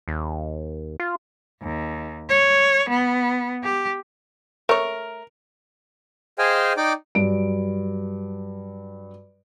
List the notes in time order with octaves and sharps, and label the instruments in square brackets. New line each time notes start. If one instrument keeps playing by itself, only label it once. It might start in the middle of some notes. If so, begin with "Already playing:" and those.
[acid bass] D#2
F4
[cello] D#2
C#5
B3
G4
[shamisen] A3 C#5 [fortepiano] A#4
[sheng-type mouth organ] G#4 C5 D#5 F5 G5 G#5
D#4 D5 G5 D6
[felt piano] G2 F#3 D7